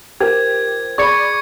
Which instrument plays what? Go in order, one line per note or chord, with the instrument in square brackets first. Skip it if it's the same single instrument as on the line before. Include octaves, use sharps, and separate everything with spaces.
[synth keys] F4 A#4 C5 [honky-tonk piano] G4 [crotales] G#6
[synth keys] G#4 [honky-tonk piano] D5 B5 [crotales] C#6 G#6 C#7